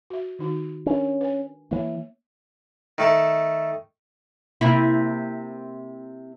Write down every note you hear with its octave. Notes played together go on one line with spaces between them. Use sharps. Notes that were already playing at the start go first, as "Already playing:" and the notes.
F#4 E5
D#3 D#4 F#4
C#4 D4 A#4 B4
B4 G#5
E3 A3 A#3 C#5 E5
D#3 A3 A4
C3 A#3 E4